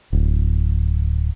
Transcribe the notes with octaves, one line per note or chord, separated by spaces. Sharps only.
D1